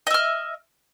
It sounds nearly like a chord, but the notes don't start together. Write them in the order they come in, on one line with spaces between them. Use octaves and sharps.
D#5 E5 F6